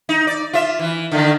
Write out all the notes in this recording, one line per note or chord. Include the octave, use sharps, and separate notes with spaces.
D#4
D5
F4 E5
E3
D3 D#3 A3